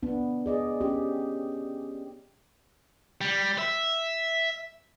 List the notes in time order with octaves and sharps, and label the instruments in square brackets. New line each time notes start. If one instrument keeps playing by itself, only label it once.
[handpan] B3 D4
G#4 D5 D#5
C#4 G4
[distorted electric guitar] G3
E5